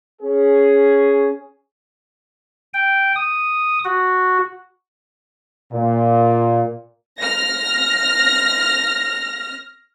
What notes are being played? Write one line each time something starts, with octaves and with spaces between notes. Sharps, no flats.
C#4 G#4
G5
D#6
F#4
A#2
F6 A#6